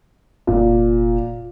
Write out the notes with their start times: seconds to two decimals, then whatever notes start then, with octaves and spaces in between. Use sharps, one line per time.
0.47 F1 A#2